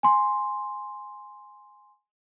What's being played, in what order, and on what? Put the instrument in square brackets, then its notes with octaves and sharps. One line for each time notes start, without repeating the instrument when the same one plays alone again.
[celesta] G#5 C6